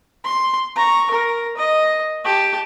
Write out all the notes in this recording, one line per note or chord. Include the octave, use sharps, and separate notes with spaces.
C6
A#5 C#6
A#4
D#5
G4 A5